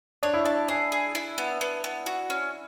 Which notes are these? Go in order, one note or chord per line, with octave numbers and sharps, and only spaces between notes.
D4 C#5
E4
D4 A5
D4 G#4
G#4
E4
B3
B3
B3
F#4
C#4